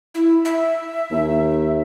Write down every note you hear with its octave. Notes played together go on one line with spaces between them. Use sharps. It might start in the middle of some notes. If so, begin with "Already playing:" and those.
E4
E5
D#2